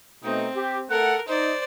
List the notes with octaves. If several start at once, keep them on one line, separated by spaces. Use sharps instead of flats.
B2 A3 C4 D#4
G4
A3 A4 A#4 F#5
D#4 C5 D5